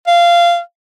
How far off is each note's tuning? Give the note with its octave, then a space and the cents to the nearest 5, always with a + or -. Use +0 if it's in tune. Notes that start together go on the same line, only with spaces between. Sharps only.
F5 -15